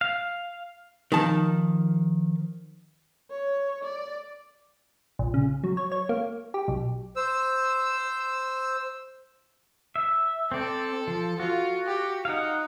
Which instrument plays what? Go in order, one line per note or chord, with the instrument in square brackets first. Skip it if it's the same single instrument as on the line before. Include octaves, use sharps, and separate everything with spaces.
[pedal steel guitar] F5
[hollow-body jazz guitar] D#3 F3 A5
[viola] C#5
D5
[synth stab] A#1
C#3
F#3
C#5
C#5
A#3
G4
B1
[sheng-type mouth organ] C5 E6
[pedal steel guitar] E5
[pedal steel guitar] C4 D5 [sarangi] A4
[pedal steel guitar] F3
[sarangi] F4 [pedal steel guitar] F#4
[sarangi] G4
[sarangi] D#4 [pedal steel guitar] F5 F#5